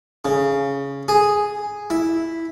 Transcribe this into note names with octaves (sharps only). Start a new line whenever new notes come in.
C#3
G#4
E4